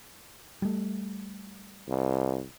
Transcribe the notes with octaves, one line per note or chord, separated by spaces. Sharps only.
G3 A3
C2